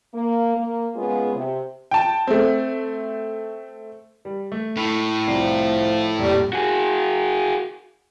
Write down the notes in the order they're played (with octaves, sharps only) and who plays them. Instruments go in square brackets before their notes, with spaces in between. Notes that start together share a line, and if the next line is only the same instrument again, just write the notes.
[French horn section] A#3
A#3
G#3 B3 C#4 F4 G#4
C3
[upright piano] G5 A5
A3 C4
[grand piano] G3
A3
[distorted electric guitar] A2
[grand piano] C2 D5 C7 [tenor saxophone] F3
[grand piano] F1 A#1 [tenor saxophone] G3
[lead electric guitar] F#4 G#4